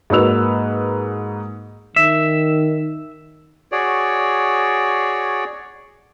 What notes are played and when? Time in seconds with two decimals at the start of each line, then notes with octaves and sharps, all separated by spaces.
0.10 G#2 A#3 F#4 B4 E6 F7
1.96 D#3 E5
3.72 F#4 G#4 C#5 D5